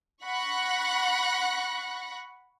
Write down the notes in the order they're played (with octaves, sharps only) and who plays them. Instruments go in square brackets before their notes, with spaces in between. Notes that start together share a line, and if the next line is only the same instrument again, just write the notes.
[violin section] F#5 B5 C#6 F#6 A#6